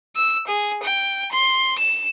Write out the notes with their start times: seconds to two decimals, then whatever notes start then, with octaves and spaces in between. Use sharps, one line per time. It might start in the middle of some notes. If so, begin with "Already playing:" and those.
0.16 E6
0.47 G#4
0.83 G5
1.31 C6
1.78 E7